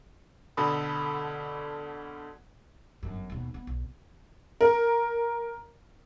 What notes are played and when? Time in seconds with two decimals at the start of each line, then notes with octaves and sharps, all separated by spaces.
0.57 B2 D3 A4 B5 D#6
3.03 G1 F#2
3.30 D#2 B2
3.54 B3
3.67 B1
4.61 A#4